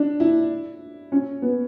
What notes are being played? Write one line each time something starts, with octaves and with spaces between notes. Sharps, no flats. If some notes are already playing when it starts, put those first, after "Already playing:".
Already playing: D4
E4
C#4
B3